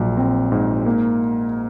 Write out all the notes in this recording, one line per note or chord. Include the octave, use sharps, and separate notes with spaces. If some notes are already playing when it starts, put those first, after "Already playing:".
Already playing: A#1 F#3
C4
G#2
A#3